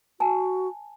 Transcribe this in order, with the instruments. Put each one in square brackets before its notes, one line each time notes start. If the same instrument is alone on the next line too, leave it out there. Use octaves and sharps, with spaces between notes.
[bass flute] F#4 [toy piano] G#5 A5